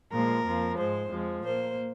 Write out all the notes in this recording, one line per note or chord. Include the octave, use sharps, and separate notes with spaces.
A#2 F3 G#3 A#4
F2 F3 A#3
G#2 G#3 C5
F2 F3 G#3
A#2 A#3 C5